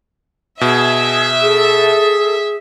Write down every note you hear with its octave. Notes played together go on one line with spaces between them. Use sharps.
B2 G#4 E5
G#4 A4